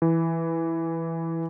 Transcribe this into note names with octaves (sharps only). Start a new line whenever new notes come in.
E3